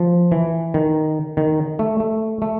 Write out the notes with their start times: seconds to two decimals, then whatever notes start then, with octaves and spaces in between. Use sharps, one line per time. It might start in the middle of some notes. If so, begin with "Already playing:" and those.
Already playing: F3
0.32 E3
0.74 D#3
1.37 D#3
1.79 A3
2.00 A3
2.42 A3